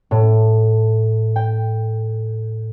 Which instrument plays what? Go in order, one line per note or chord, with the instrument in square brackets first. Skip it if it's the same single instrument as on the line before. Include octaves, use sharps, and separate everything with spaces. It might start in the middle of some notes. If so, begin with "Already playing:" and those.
[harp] A2
G5